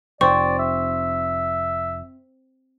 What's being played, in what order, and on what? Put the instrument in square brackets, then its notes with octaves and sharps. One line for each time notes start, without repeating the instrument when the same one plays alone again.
[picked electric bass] F1 [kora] C4 [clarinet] D5 [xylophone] C#6
[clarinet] E5